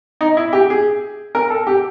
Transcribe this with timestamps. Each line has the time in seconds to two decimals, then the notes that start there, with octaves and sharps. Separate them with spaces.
0.21 D#4
0.37 E4
0.53 G4
0.70 G#4
1.35 A#4
1.50 A4
1.67 G4